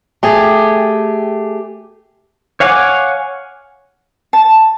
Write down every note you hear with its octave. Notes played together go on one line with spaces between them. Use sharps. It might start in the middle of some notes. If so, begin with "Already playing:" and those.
A3 G4 G#4
C#5 F5 F#5 G#5 D6
A5